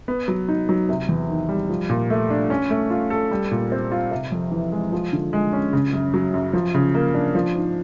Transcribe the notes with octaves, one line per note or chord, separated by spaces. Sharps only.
B3
F#3
D#4
F#3
C3
E2
D#3
G3
F3
A#2
A3
D4
C#4
A3
F4
A4
G3
A#2
C4
F4
C3
F2
E3
G#3
F3
D3
G#3
C#4
C#3
F#2
F#3
F#2
F3
C#3
A#3
D4
F3
G#2